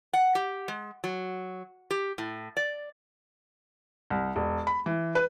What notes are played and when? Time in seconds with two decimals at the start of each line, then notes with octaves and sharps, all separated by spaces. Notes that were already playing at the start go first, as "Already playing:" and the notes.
0.13 F#5
0.35 G4
0.68 G#3
1.04 F#3
1.90 G4
2.18 A2
2.57 D5
4.10 C2
4.36 E1
4.67 B5
4.86 E3
5.15 B4